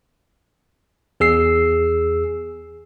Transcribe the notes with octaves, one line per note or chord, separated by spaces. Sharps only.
E2 G#4 E6 C7